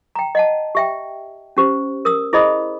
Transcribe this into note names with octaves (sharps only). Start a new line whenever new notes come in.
G5 A#5
D#5 F#5 A5
G4 E5 G5
C#4 G4 C5
A#4 D#6 E6
E4 G#4 C5 D#5 B5 D#6